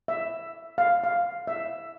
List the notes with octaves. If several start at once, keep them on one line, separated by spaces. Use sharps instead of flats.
E5
F5
F5
E5